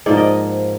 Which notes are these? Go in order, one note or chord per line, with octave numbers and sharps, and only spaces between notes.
G#2 F3 A#3 D5
D#5